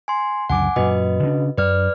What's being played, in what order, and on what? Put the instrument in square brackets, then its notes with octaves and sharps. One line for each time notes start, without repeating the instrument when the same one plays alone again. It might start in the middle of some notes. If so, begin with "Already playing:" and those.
[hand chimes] G#5 C6
[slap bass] C#2 F#2 D3 [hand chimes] F#5 G#5 D6
[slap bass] F#2 A#2 [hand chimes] F#4 B4 D#5
[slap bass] C#3 D4
[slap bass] F#2 [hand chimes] B4 D5 F6